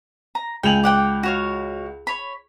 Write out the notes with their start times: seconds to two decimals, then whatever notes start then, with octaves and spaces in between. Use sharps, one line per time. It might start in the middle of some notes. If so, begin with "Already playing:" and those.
0.35 A#5
0.63 C#2 G5 G#5 F7 F#7
0.83 D5 F#5 G5
1.23 F#4 C#5 F5
2.07 C#5 B5